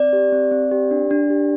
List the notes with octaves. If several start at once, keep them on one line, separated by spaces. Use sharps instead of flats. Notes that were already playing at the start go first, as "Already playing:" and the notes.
Already playing: C4 D5
G4
C4
C4
G4
D4
D4
G4